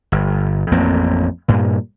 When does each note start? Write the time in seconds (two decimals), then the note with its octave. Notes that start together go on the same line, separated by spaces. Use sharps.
0.12 G1
0.71 A1 F2 A#3 C4
1.48 G2 A#2